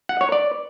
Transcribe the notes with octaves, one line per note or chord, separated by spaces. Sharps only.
F#5
C#5
D5